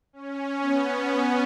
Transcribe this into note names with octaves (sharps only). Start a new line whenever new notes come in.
C#4
B3